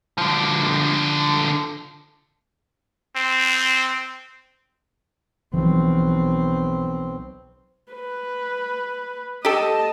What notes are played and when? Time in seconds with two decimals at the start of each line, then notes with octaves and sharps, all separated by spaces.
0.18 D3 F3
3.16 C4
5.54 B1 E3 F3 C4
7.93 B4
9.45 G4 A4 D#5 A5